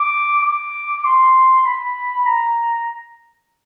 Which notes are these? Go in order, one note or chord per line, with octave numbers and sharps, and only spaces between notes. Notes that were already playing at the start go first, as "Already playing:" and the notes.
Already playing: D6
D6
C6
B5
A#5